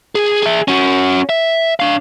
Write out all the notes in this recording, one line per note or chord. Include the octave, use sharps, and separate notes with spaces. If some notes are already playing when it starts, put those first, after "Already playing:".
G#4
G#4 E5
C#4 F#4
E5
D4 F5